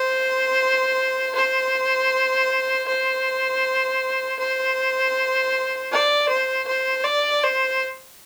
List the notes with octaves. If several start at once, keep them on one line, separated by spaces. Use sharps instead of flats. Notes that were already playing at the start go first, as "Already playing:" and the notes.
Already playing: C5
C5
C5
C5
D5
C5
C5
D5
C5